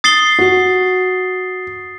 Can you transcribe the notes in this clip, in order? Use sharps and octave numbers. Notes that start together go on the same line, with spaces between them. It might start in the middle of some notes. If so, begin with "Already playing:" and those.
D#6 A6 C7 G7
F#4